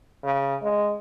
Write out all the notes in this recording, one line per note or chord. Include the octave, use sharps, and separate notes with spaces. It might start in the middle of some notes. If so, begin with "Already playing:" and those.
C#3
G#3